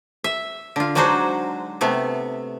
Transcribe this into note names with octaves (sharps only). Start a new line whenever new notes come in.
E5
D3 F4
F#3 G#3 D4 D#4 F#4 C5
C3 A3 B3